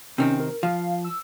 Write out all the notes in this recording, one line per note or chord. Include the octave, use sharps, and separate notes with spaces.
C3 D#3 C4 C#4
A#4
F3 F5
E6